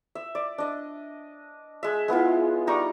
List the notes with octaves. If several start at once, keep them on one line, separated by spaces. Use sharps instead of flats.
E5
D5
D4 D#5
G#3 E5
G#3 B3 E4 F4
G3 D#4 A#5 C#6